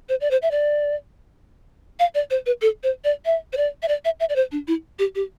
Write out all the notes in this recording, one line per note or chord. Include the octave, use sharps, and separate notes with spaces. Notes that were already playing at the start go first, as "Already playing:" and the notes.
C5
D5
C5
E5
D5
F5
D5
C5
B4
A4
C5
D5
E5
C5
D5
E5
D5
E5
E5
D5
C5
D4
E4
G4
G4